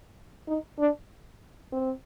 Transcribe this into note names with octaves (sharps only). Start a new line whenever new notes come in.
D#4
D4
C4